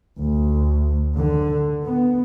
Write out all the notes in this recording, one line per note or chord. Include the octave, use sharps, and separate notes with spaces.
D2
D3
B3